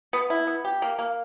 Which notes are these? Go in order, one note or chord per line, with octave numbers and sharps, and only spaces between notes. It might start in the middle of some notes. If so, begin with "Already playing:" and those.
B3
E4
B3
G4
A#3
A#3